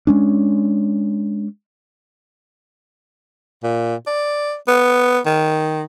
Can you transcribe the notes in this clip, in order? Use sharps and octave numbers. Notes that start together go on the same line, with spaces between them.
G#3 C#4 D4
A#2
D5
B3
D#3